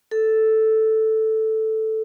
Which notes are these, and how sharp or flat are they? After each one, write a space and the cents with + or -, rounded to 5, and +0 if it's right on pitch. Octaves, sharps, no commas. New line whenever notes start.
A4 +0